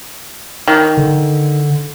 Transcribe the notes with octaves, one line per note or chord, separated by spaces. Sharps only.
D#3
D3